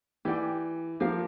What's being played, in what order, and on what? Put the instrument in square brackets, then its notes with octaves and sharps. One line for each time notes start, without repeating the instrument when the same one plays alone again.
[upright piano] E3 [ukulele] G4 D5 G5
[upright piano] F3 [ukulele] G4 A#4 F5